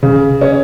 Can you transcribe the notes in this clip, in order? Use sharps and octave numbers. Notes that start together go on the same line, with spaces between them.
C#3
C#4